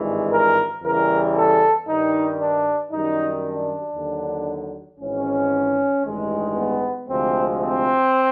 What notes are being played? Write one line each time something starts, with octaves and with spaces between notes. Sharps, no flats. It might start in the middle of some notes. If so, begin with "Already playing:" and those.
Already playing: G#1 G2 E3 G#3
A#4
E2 C#3 E3 G3 A#4
A4
G2 D#3 G3 D#4
D4
F#2 D#3 G3 D#4
D4
D#2 D3 F#3
G#1 G#2 E3 C#4
A1 G2 D#3 G#3
B3
D2 C3 F3 G#3 C4
C4